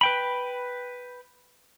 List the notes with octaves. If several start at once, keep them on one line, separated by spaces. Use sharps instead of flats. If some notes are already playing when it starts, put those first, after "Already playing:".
B4 G5 B5